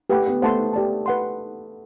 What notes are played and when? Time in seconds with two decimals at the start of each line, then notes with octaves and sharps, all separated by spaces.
0.10 A3 G4 B4 F#5 B5
0.26 B3
0.42 A3 C5 F#5 A5 C6
0.73 G4 D5 A5
1.06 B4 F#5 C6